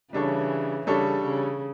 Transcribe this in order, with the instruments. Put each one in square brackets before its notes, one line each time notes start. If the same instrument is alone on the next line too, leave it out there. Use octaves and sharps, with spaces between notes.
[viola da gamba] C#3 E3 [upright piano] G3 D4 A4 C#5
[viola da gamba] C#3 [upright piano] G3 D4 A4 C#5
[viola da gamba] C#3